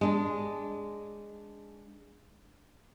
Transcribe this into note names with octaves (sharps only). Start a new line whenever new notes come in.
G#3 D4